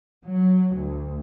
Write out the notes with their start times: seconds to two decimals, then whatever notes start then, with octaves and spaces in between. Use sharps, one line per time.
0.24 F#3
0.76 D2